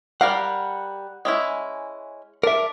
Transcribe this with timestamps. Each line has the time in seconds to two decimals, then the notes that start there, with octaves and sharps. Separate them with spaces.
0.21 G3 A#4 F5 F#5
1.25 G#3 C#4 E4
2.43 D4 A#4 E5